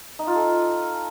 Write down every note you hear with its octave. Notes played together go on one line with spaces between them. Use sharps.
D#4
F4
A4